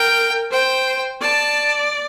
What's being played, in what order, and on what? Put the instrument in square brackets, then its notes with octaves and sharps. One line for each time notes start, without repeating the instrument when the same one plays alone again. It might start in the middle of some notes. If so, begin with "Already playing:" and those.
Already playing: [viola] A#4 [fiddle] G5
[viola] C5 [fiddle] G5
[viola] D5 [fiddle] A5